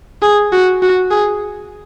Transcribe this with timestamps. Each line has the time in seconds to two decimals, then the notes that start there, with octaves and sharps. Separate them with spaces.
0.22 G#4
0.52 F#4
0.82 F#4
1.11 G#4